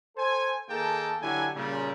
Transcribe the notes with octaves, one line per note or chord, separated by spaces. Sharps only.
A4 C5 G#5
D#3 A#3 G#4 A4 G5 A5
D3 F#3 E4 G4 G#5
A#2 C#3 G3